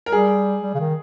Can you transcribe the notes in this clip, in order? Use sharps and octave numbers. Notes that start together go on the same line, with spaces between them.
A#4
G3 G#4
G3
C#3
D#3